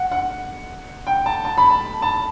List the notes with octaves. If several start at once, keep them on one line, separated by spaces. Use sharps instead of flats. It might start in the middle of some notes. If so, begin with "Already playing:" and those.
Already playing: F#5
F#5
G5
A5
A5
B5
A5
A5